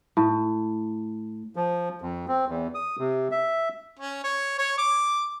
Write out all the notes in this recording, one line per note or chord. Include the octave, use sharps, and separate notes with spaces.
A2
F3
F2
C4
E2
D#6
C3
E5
C#4
C#5
C#5
D6